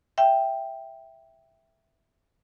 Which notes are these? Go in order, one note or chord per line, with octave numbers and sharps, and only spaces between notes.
E5 G5